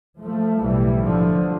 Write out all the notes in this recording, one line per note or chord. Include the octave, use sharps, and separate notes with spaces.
F3 A3
B1 A2 E3 G3
D3 F3